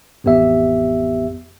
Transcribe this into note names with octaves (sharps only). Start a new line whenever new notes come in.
A1 F2 B3 G4 E5